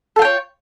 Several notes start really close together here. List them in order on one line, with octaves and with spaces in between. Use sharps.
A4 F4 G5 C#5